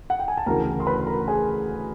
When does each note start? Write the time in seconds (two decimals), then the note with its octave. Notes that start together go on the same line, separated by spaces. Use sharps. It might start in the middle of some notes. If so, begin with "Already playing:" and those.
0.10 F#5
0.19 G5
0.28 G#5
0.37 A5
0.46 D2 C#3 E3 A#4 A#5
0.80 C6
0.87 B4 B5
1.07 A#4 A#5
1.28 G#4 G#5